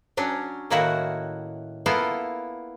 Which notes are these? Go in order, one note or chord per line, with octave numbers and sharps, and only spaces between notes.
F#3 C#4 D4
A2 D#3 A#3 E4 F#4 F#5
A#3 B3 E4 F4 A4